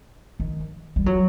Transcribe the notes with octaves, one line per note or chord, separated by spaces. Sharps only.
D#3
G3
F#3